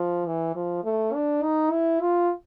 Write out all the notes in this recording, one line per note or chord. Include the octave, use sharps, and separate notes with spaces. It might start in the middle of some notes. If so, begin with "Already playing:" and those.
Already playing: F3
E3
F3
A3
D4
D#4
E4
F4